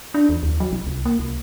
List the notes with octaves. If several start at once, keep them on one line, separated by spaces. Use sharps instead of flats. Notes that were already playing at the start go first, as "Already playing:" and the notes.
D4
E2
D#2
F#3
B1
C2
A#3
C2